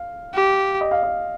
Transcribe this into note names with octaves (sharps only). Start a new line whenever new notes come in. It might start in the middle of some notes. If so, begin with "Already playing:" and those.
Already playing: F5
G4
D#5
F5
D#5